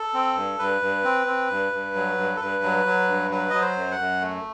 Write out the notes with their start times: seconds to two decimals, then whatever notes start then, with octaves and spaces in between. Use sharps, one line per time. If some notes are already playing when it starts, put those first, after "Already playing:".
Already playing: A4
0.14 C4
0.36 G2
0.59 G2 B4
0.82 G2
1.04 C4
1.27 C4
1.50 G2
1.72 G2
1.95 F#3
2.18 G2
2.36 A4
2.41 G2 B4
2.63 F#3
2.86 F#3
3.08 G2
3.31 F#3 B4
3.50 F#3 D#5
3.61 C5
3.76 F#2
3.92 F#5
3.99 F#2
4.21 A3